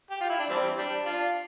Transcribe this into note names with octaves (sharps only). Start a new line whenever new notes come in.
G4
F4
E4
D4
E3 G3 C4
G3 D4
D4 F4